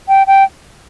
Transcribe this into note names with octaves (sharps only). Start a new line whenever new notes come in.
G5
G5